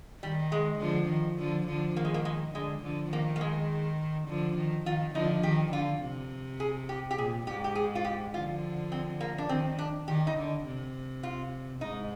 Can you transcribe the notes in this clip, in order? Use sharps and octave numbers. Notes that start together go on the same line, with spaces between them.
D#3 G3
G#3
D3 F3
D#3
D3 F3
D3 F3
D#3 A#3
G#3
A#3
G#3
D3 G#3
D3 F3
D#3 A#3
A#3
G#3
D3 F3
D#3
D#3 F4
D3 F3 D#4
D#3 G4
D3 F4
C3
G#4
G4
G4
A#2 G#4
G#2 G4
G4
G#4
F4
G4
D3 F3 F4
C4
A#3
D4
D#3 C4
D4
D#3 G4
D#4
D3
C3
F4
G#2 D#4